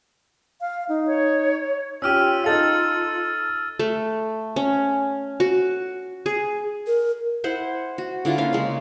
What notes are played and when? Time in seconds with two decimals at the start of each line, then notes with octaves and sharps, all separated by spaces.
0.61 F5
0.89 D#4
1.05 C#5
2.02 C#4 F4 G4 E6 F6 D#7
2.44 D#4 A4 F5 E6 A6
3.79 A3
4.56 C#4
5.40 F#4
6.26 G#4
6.87 A#4
7.44 E4 C5 F#5
7.98 F#4
8.25 D3 E4 F4
8.38 A#3 C#4 F5
8.53 C#3 G#3 C#5